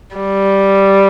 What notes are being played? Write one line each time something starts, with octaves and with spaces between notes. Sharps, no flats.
G3